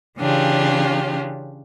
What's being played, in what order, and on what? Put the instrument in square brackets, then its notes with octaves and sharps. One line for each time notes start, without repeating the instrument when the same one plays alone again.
[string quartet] C#3 E3 C#4 D4 F4 G4